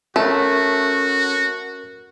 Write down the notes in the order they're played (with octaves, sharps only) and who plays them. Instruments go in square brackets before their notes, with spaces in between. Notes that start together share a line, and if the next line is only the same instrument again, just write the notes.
[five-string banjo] A3 [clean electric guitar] C#4 [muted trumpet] F#4 [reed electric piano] A#4